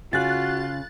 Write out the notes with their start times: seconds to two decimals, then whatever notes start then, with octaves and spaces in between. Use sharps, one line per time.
0.13 C#3 F4 F#4 F#6 A6